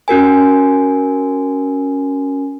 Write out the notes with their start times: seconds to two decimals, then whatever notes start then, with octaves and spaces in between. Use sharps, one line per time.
0.08 C#4 F#4 A#4 G#5